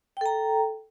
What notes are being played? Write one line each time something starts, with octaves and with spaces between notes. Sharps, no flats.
A4 G5 A#5